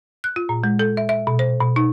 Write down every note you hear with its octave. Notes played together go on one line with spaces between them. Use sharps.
F#6
F4
A#2
G#3
A4
E5
E5
B2
C5
B2
D#4